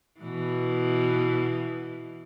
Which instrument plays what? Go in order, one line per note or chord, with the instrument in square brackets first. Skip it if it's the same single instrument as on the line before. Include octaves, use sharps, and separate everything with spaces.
[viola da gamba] B2 E3